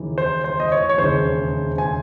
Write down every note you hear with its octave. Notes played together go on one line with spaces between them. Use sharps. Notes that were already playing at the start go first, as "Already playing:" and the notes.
Already playing: D#2 C#3 E3
C5
C5
D#5
C#5
C#5
E1 D#2 C#3 E3 C5
G#5